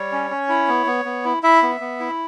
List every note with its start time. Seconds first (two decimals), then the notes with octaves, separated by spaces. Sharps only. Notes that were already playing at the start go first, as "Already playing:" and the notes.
Already playing: G3 C#5
0.12 C#4
0.31 C#4
0.49 E4
0.68 B3
0.86 B3
1.05 B3
1.25 E4
1.43 E4 E5
1.62 B3
1.81 B3
2.00 E4